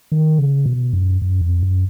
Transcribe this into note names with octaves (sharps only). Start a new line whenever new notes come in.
D#3
C#3
B2
F#2
F#2
F2
F#2